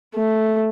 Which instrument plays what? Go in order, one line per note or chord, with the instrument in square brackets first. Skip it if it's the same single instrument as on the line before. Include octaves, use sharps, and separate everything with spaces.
[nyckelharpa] A3